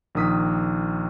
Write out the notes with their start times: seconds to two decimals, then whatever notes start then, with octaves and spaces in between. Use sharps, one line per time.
0.15 A#1 D#3 D#6 B6